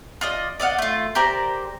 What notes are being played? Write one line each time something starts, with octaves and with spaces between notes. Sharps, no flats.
F4 D5 D#5
D5 D#5 F5 F#5
A3 F4
G4 A#4 C5 D5